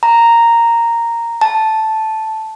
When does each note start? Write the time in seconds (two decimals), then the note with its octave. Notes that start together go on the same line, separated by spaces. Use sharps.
0.03 A#5
1.41 A5